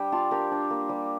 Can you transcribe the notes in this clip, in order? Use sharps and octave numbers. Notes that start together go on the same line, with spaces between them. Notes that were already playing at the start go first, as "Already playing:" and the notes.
Already playing: G3 D4 G5
F4 F5 A5
D4 G4 A#4
D4
A#3
G3